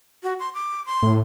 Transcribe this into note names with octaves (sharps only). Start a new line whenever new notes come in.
F#4
C6
D6
C6
A2